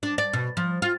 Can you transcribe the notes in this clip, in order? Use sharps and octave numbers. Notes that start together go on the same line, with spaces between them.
D4
D5
B2
F3
F4